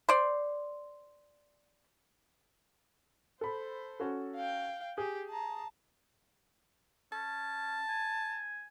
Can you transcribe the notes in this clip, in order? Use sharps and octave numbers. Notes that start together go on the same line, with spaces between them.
C5 D5
A4 C5 B5
C#4 F#4 A4
F5 G5
G4 G#4
A5 A#5
C#4 A5
G#5